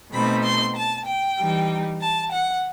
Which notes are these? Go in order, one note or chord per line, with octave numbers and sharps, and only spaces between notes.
B2 A3 C4 D#4 B5
C6
A5
G5
E3 G3 D#4
A5
F#5